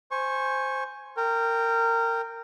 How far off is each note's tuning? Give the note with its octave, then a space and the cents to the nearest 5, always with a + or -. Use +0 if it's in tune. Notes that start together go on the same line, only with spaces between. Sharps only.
C5 +0 G#5 +0 C#6 -20
A#4 -20 G5 +0